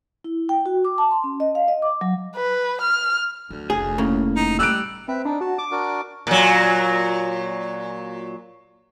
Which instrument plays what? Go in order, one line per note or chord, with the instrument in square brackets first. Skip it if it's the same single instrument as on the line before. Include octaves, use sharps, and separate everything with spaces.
[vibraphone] E4
G5
F#4
D6
A5
C6
C#4
D#5
F5
D#5
D6
F#3
[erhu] B4
F6
[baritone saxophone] D2 [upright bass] F#3
[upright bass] F1 [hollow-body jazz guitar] G#4
[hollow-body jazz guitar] A2 C#3 A#3
[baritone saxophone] D#4
[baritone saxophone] G3 [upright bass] A3 [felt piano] E6 F#6 D7
[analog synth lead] C4 [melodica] B4 E5
[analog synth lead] D4 [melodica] D#4
[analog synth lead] F#4 [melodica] A5
[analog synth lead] D6
[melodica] D4 F#4 A#4
[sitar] A#2 F#3